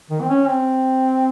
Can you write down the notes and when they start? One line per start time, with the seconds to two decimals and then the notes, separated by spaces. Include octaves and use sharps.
0.10 D#3
0.21 C4
0.29 C#4
0.47 C4